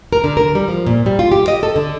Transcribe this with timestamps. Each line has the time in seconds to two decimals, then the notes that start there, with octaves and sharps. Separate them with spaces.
0.13 A#4
0.24 D3
0.37 A#4
0.55 G3
0.68 F3
0.87 A#2
1.06 G3
1.19 F4
1.32 G4
1.48 D#5
1.63 A4
1.76 D3